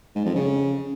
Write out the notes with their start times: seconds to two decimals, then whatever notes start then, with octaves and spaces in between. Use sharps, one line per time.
0.15 G#2
0.25 F2
0.36 C#3